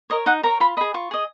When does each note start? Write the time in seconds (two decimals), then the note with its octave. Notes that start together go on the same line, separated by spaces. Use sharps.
0.10 A#4 C#5 D#5
0.26 D#4 F#5
0.43 A#4 C#5 A#5
0.60 F4 B5
0.77 D#5 B5
0.81 G#4
0.94 F4 C#6
1.11 G#4 D#5